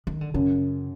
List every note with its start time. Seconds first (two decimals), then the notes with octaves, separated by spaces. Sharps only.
0.07 D#3
0.21 D3
0.34 F#2 C#3